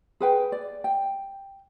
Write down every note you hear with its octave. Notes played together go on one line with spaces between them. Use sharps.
G#4 B4 G5
D5
G5